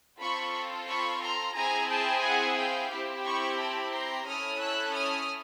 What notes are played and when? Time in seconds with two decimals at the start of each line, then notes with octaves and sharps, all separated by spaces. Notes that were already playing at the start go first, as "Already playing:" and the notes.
0.20 C4 F4 A4 B5 C#6
0.88 B5 C#6
1.22 A#5 C6
1.56 C4 E4 G#4 G#5 A#5
1.90 G5 A5
2.23 F#5 G#5
2.58 F5 G5
2.92 C4 E4 G4
3.25 B5 C#6
3.59 A5 B5
3.93 A#5 C6
4.27 C#4 E4 A4 D#6 F6
4.61 E6 F#6
4.95 D#6 F6